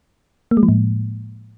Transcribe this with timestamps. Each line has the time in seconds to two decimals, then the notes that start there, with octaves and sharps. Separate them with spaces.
0.51 A#3
0.57 G#3
0.63 F3
0.69 A2